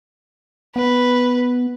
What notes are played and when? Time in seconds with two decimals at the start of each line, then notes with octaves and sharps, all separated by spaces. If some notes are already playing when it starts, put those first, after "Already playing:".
0.76 B3 B4